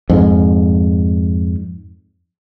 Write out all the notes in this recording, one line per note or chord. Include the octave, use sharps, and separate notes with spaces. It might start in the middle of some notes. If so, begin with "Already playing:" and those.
F2 G#2